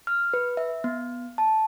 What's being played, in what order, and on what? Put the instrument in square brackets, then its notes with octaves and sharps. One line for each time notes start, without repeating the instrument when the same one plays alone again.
[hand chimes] F6
B4
E5
B3
A5